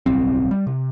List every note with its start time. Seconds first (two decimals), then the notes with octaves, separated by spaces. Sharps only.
0.06 D1 B1 G3 C4
0.51 G3
0.67 C3